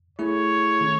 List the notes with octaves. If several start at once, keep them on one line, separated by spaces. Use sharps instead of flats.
A3 E4 G#4 C#5
D#3 A3 C#4